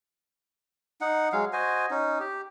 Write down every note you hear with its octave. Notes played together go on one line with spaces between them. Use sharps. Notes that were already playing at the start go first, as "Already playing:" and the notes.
D#4 F#5
F#3 G#3 F5
F#4 C5 D#5 G#5
C#4 D#4
G4